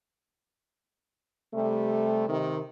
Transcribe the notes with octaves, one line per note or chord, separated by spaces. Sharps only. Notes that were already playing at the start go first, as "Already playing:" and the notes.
C3 G3 A3
C3 D#3